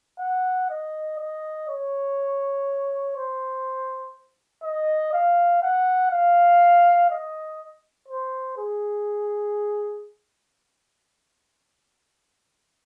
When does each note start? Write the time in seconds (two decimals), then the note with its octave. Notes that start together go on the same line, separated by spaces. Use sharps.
0.20 F#5
0.70 D#5
1.19 D#5
1.69 C#5
3.16 C5
4.63 D#5
5.13 F5
5.63 F#5
6.11 F5
7.10 D#5
8.08 C5
8.58 G#4